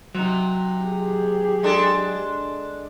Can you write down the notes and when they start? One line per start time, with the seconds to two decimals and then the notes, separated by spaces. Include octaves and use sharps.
0.15 C3 F#3 D#4
0.83 G4 G#4
1.63 G#3 D4 A4